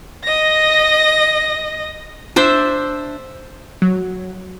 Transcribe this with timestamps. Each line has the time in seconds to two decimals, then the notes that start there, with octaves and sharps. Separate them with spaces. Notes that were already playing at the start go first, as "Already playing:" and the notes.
0.24 D#5 A#6
2.36 D4 C5 E5
3.82 F#3